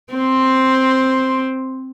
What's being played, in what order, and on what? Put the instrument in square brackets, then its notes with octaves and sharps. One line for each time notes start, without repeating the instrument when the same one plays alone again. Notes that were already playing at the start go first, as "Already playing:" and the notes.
[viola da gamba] C4 C5